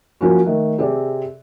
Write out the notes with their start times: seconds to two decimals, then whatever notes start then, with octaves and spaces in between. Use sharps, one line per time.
0.21 F3 F#3 A#3 C#4 F#4
0.45 D#3 A3
0.78 C3 C4 G#4 A4 D5